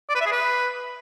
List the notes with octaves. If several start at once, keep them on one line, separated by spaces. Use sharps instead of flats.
D5
B4
E5
G#4
B4